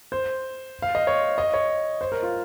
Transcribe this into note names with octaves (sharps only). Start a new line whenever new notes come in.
C5
F5
D#5
C#5
D#5
C#5
C5
A#4
F4